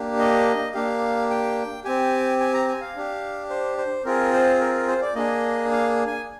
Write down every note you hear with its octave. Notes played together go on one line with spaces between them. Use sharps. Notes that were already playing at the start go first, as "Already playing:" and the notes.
Already playing: A#3 D4 G4
D#5
A#3 D4 G4 F5
G5
C4 G4 G#5
G#5
A#5
G#5
F5
D4 G4
C5
C5
C4 F4 G#4 A#4
C5
A#4
A#4
C5
D5
A#3 D4 G#4 D#5
F5
G#5